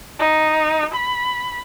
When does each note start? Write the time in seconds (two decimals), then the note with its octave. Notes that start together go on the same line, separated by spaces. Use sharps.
0.20 D#4
0.94 B5